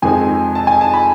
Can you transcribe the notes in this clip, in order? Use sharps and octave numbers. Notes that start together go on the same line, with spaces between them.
F2 C3 D#3 G#3 C4 G#5
A5
G#5
A5
B5